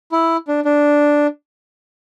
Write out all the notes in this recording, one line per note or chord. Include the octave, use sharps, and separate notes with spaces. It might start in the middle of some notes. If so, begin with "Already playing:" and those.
E4
D4
D4